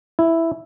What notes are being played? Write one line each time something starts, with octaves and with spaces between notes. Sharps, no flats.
E4